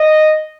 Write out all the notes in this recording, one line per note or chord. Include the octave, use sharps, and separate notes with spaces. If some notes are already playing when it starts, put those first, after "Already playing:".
Already playing: D#5